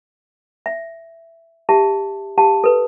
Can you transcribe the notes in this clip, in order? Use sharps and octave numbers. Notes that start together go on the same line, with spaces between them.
E5
G4 E5 A5
G4 F5 A5
A4 B4